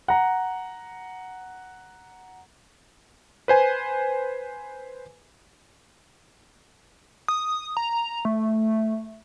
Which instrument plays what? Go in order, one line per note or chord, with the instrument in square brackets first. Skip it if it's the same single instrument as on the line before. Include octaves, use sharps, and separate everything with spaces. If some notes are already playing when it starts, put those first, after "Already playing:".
[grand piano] F#5 A#5
[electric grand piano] B4 C5 G#5
[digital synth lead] D#6
A#5
A3